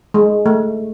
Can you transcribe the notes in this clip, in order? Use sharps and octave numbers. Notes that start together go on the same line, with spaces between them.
G#3
A3